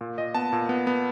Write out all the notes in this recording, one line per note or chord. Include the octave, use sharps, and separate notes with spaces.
A#2
A#2 D#5
B3 A5
A#2
B3
B3